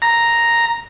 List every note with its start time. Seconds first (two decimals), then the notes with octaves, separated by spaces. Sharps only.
0.02 A#5